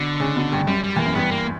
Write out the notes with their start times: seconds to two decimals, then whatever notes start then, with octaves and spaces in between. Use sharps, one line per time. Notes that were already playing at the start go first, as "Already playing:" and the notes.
Already playing: B2 D3
0.20 C#3
0.36 B2
0.52 G2
0.67 F#2 G3
0.84 G3
0.96 E2 A#3
1.05 F#2
1.15 G2 B3
1.31 A#3